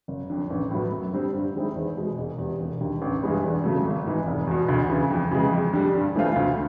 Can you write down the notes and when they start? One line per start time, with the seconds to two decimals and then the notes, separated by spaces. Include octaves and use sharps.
0.08 F#1
0.30 F2 D3
0.50 A1
0.71 A2 F#3 B3
0.92 F#2
1.13 D3 G3 C4
1.33 G2
1.55 D#3 G#3 C4 E4
1.76 E2
1.97 B2 G#3
2.18 E1
2.38 E2 C3
2.60 E1
2.81 D#2 D3
3.02 A1
3.23 G2 E3 G#3 B3
3.44 E2
3.64 C#3 F#3 A3
3.85 G#1
4.06 G#2 E3
4.27 F1
4.47 E2 B2
4.68 D2
4.90 C#3 E3
5.11 F2
5.31 C#3 E3 G#3
5.53 F2
5.74 D3 G3
5.94 G2
6.16 E3 A3 C4 F4
6.36 D2